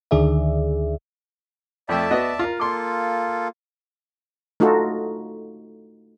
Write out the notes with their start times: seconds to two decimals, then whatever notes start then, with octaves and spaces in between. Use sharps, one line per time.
0.11 D2 D3 D#3 G#4 D5 E5
1.89 F2 A3 D5 E5 G5 A5
2.11 B3 F#4 D#5
2.39 F4 A#4
2.60 A#3 F4 A4 C6 D6
4.60 A3 D#4 F4 F#4 A4